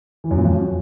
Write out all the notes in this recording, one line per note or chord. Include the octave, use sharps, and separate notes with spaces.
E3
F#2
A#2
F2
F#3